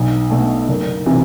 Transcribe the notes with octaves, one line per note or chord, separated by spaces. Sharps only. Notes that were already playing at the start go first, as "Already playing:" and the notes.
Already playing: B1
B2 A3
F#1
C3 E3